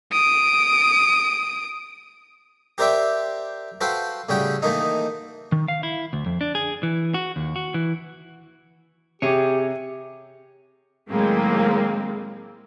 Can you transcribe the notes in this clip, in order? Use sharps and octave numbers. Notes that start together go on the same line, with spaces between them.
D#6 D7
G4 A#4 C5 D5 E5 G5
F#4 A4 B4 C5 F5 G5
A2 C#3 G3 C#4 F#4 G5
D#3 E3 A3 A#3 D#4
D#3
F5
E4
D2
F2
D4
G#4
E3
F#4
D#2
F#4
E3
C3 G4 G#4 C#5
A2 D#3 F#3 G#3 A#3 C4